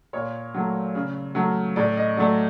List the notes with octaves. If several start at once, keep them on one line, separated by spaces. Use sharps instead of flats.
A#2 C#5
F#3 A3
C#3
F#3 A3
A2 D5
D#5
F#3 A3 D5